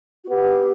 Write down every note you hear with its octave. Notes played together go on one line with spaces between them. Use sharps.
F#4
B3 G4